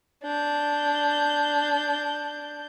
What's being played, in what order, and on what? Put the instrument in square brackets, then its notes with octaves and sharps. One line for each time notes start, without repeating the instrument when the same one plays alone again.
[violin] D4 G6